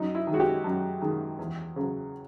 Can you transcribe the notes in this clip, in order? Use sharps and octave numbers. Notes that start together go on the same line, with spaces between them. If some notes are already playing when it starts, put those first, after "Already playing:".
Already playing: F#2 D#4
E4
D#3
G#3 F#4
G4
F#2
D#3 G#3
E2
C#3 F#3